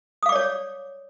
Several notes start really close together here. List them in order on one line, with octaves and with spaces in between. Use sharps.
D#6 F5 D6 D5 C#5